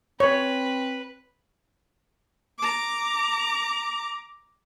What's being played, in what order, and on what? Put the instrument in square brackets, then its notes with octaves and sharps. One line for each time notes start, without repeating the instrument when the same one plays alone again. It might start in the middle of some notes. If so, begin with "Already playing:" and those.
[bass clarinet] C4 [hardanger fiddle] B4 [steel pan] C#5
[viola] A#5 D6